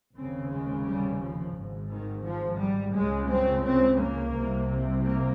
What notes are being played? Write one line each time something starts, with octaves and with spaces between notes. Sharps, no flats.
F1 D#2 C#3 C4
G#3
G3
F3
G#1 G#2
D#3
F3
G3
C#2 C#3 G#3
C4
C4
A#3
C2 C3
A#3